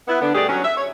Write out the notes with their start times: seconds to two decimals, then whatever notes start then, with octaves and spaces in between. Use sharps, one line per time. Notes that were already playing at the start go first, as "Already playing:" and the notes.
0.08 B3 E4
0.21 D3 B3 D4
0.35 B2 G3 A3 G4 G#4 D5
0.49 F#3 C#4
0.64 E5
0.77 C#5